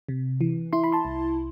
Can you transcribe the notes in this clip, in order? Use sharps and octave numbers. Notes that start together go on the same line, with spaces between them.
C3
E3
E4 C6
B5
A5 C6
C2